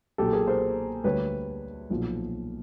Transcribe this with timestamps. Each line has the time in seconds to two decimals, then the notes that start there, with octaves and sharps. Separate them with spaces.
0.18 B1 A#2 F#3 G4 A4
0.33 G#4 A#4
0.47 A#4 C5
1.04 D2 D3 G3 B4 C#5
1.90 B1 A#2 F3